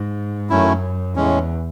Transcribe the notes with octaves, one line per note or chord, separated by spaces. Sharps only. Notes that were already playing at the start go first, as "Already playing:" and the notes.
Already playing: G#2
F#2 D#3 F#3 A3 C#4 E4
E2 A2 G#3 C#4